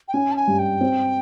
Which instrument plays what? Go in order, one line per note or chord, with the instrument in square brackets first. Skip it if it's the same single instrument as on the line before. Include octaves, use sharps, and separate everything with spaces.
[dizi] G5
[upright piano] C#4 [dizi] G#5
[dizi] A5
G#5
[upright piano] G2
[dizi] G5
[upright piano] C4